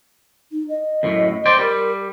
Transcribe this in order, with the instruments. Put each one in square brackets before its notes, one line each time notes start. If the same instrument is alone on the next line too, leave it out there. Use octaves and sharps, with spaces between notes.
[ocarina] D#4
D#5
[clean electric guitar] F#2 A2
C5 D5 G5
[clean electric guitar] G3 [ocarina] A#4